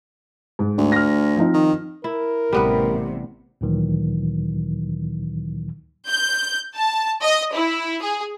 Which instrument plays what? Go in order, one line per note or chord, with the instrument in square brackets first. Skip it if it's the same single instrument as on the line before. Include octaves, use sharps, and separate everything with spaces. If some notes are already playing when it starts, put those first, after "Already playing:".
[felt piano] G#2
[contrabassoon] D2
[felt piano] F6 A#6
F3 C4 D#4
[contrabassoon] D#3
[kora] E4 [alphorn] A#4
[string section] A1 C3 [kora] G3 B3 B4
[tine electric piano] D2 A#2 D#3 E3 F#3
[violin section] G6
A5
D#5
E4
G#4